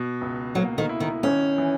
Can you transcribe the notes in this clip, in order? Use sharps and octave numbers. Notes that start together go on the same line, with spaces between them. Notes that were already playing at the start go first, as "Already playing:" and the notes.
Already playing: B2
C#2
F#3 A#3
D#3
E4
D#3
G#1 C#4
E3